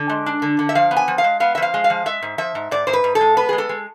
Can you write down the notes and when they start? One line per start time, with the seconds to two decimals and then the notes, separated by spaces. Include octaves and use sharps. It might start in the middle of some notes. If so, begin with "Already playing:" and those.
Already playing: D3
0.09 G#3
0.26 D4
0.42 D3
0.59 D3
0.69 E5
0.75 F3 F5
0.91 B3
0.97 G#5
1.08 F3
1.18 F5
1.24 G#3
1.40 B3 F5
1.55 E5
1.58 F3 F5
1.74 G#3
1.84 F5
1.90 F3
2.06 G#3 E5
2.23 G#2
2.38 F3 E5
2.55 G#2
2.71 G#2 D5
2.87 G#2 C5
2.93 B4
3.04 G#2
3.15 A4
3.21 G#3
3.37 B3 B4
3.49 G#3 G#4
3.58 A4
3.69 G#3